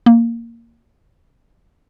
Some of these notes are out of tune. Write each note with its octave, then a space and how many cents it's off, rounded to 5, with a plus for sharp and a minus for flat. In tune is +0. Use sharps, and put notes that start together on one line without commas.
A#3 -10